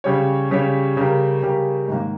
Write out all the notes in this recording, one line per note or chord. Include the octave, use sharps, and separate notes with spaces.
C#3 G3 C#4 G4 C#5
C#3 G3 C#4 G4 C#5
C#3 G3 C#4 G4 A#4
C#3 G3 C#4 G4 A#4
G#2 D#3 A#3